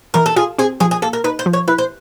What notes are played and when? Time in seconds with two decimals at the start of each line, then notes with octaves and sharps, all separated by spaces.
0.14 E3 A#4
0.26 A4
0.36 F4 G#4
0.58 C4 G#4
0.80 F3 G#4
0.91 G#4
1.02 A#3 A4
1.13 A#4
1.24 D#4 B4
1.39 C5
1.46 F3
1.53 C#5
1.68 E4 B4
1.78 C5